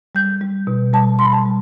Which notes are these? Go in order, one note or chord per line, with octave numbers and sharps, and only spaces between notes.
G3 G6
G3
B2
G3 A5
G3 C6
B5
A5
G3